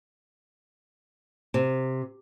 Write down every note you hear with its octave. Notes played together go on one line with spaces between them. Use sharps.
C3